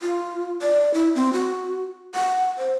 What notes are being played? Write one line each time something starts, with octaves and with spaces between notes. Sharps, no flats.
F4
D5
E4
C4
F#4
F#5
C5